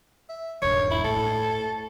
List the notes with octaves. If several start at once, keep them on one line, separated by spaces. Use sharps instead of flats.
E5
D#1 G2 C#5
E4
A2 A4